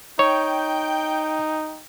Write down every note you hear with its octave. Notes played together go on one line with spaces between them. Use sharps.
D#4 C#5 G5